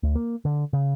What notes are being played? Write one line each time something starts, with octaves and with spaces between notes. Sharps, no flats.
D2
A#3
D3
C#3